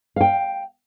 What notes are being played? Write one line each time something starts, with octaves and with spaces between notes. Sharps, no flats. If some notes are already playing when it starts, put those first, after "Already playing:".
F5 G5